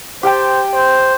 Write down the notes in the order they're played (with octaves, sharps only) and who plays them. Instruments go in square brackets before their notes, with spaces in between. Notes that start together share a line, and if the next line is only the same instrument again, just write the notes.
[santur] G4 G5 A5 [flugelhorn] C5
[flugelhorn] C5